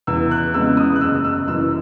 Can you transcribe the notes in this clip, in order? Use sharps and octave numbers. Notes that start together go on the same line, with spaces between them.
E2 E6
F#6
C#3 G#3 B3 E6
D#6
F#6
F#1 E6
E6
F#2 E3 E6